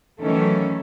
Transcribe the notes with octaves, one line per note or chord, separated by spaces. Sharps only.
D#3 E3 F#3 A3 C#4 A4